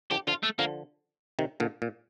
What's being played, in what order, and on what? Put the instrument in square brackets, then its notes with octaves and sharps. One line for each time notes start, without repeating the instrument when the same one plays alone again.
[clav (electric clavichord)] D3 F3 [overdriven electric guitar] G4
[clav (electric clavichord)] D3 F3 [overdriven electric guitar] F4
[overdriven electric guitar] A3
[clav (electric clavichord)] D3 F3 [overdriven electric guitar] A#3
[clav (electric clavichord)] C3 D#3
A#2 D3
A#2